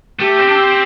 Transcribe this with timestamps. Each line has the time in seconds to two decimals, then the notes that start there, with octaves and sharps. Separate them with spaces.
0.20 A3 G4
0.39 C4
0.47 D4
0.55 C4